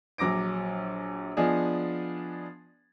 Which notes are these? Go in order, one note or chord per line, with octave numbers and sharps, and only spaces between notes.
A#1 F#3 D6 A#6 D7
F3 B3 D4 G#4 D#5